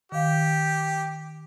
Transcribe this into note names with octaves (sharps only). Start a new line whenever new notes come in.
D#3 G4 F5